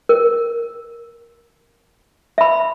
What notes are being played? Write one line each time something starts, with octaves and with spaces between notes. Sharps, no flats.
A#4
E5 B5